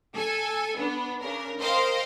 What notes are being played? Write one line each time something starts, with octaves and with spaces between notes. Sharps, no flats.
A4 G#5
B3 D4
C#3 D4 A#4
A#4 C5 D#5 F5 G5